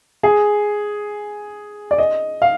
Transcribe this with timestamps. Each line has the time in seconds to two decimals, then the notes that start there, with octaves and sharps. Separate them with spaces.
0.23 G#4
1.91 D5
1.98 D#5
2.42 F5